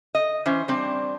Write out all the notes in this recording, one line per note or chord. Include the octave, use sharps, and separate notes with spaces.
D#5
E3 C#4 C5
G3 C4 D4